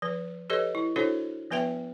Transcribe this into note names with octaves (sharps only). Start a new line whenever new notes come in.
F3 B4
G4 A4 B4 C#5 D#5
E4
D4 E4 F#4 A4 C5 C#5
F3 B3 B4 E5 G5